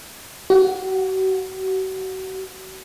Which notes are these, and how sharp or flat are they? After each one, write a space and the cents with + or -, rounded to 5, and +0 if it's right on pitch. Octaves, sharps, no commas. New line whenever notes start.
F#4 +40 F#5 -30